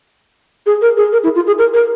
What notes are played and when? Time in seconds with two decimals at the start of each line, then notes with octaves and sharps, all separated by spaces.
0.66 G#4
0.81 A#4
0.97 G#4
1.12 A#4
1.23 E4
1.35 F4
1.47 G#4
1.58 A#4
1.73 A#4